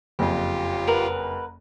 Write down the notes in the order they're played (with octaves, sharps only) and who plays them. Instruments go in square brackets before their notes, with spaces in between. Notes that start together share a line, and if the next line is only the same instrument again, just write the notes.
[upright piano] F#1 F2 [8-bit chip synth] F4 G4
[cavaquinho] A#4 B4 F#5